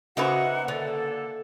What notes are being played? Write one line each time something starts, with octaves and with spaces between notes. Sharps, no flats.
C#3 A#3 D#4 F#4 B4 C5 E5 F#5
D3 A#3 A4 D5